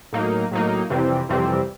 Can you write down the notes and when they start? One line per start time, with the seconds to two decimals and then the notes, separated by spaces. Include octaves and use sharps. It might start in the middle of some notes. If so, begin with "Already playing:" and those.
0.13 A2 F#3 A#3 D#4
0.51 A2 F#3 A#3 D#4
0.90 F2 C3 E3 G3 C4
1.29 F2 C3 E3 G3 C4